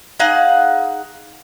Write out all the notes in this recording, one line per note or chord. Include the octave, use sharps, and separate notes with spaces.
D#4 G#4 F5 F#5